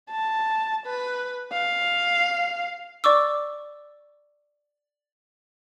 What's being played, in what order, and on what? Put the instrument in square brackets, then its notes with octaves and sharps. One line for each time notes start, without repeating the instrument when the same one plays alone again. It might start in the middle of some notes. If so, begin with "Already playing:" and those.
[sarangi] A5
B4
F5
[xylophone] D5 C#6 D6 E6